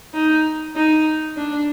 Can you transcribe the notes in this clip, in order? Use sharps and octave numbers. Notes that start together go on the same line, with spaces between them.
D#4
D#4
D4